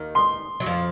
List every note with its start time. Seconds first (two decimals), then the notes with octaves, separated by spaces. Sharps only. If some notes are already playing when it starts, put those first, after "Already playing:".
Already playing: D#2 D#3
0.15 C6
0.60 F#3
0.66 F2 F3